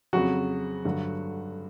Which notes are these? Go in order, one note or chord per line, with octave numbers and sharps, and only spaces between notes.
F2 C#3 F#3 F#4
G2 D3 F#3